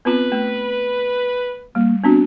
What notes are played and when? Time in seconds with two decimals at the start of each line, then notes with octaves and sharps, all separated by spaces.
0.05 B3 C4 F4 B4
0.32 A3
1.75 G3 A#3
2.04 B3 C4 D4 F#4